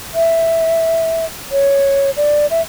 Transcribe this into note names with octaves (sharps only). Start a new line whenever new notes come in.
E5
C#5
D5
E5